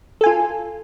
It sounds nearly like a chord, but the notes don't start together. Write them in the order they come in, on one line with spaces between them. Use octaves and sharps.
A4 G#5 F4